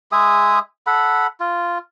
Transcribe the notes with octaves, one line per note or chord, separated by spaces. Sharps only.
G#3 G#4 E5 D#6
A4 F#5 B5
F4